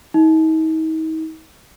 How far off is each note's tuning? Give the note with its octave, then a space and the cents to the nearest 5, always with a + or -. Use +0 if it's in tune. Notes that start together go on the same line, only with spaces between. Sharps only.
D#4 +40